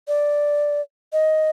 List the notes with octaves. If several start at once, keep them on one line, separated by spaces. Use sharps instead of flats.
D5
D#5